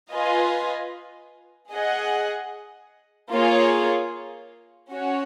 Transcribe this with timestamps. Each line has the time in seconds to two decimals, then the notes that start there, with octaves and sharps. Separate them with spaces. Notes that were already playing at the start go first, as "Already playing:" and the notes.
0.13 F4 B4 D#5 G#5
1.72 G#4 D#5 F#5
3.32 A#3 F4 G#4 C#5
4.92 C#4 F#4 C#5